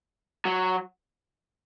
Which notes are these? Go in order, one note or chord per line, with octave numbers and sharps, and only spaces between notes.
F#3